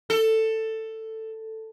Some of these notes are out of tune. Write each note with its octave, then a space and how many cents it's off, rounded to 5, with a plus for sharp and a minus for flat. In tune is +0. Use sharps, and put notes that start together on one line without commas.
A4 +10